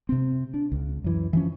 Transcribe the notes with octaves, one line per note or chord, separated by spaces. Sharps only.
C3 C4
D4
C#2
F#2 E3
E3 F3 C#4